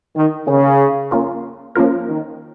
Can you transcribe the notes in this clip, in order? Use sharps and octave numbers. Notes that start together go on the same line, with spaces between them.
D#3
C#3 A#3 C#4 G#4
A#3 C#4 F4 A#4
F3 A#3 C#4 F4 A#4
D#3